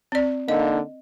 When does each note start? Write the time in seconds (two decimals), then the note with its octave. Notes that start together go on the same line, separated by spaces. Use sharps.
0.12 C4 D5
0.48 D3 A#3 D#4 D#5